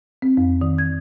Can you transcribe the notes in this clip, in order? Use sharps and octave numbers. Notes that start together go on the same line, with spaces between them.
C4
F2
D#3
G#6